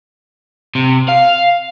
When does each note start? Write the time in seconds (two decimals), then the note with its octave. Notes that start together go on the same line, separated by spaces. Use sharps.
0.75 C3
1.09 F5